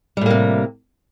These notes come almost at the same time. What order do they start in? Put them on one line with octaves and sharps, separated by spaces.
G3 A2 A#3 C3